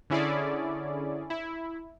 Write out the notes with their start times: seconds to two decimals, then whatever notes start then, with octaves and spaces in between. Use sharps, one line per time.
0.10 D3 C#4 E4 G#4 D5
1.30 E4